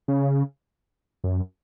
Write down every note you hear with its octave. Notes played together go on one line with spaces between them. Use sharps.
C#3
F#2